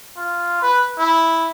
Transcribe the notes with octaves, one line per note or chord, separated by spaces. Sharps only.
F4
B4
E4